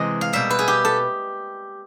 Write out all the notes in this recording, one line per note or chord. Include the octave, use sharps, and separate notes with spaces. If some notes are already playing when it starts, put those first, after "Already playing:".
Already playing: C3 E3 G#3 D#5
F5
B2 G3 A#3 E5
B4
G#4
G4
A4